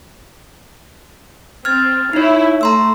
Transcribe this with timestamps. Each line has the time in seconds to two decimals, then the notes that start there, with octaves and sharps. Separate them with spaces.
1.65 C4 F6 G#6 A6
2.13 D#4 E4 C#5
2.61 A3 A#5 C6 E6